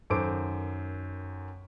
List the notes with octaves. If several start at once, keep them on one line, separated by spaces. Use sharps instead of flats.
F#2 D#3 A4 C5 D6 D7